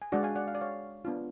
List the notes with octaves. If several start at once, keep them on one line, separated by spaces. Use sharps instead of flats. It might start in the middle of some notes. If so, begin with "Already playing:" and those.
G#5
G#3 D4 F#4 D5 F#5
F5 G#5
D5 F#5
F5
D5
C#5 F5
B3 D4 F4